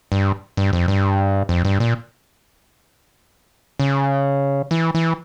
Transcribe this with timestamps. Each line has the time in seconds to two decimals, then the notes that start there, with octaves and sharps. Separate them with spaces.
0.12 G2
0.57 G2
0.73 F2
0.88 G2
1.49 F2
1.65 G2
1.80 A#2
3.80 C#3
4.71 E3
4.95 E3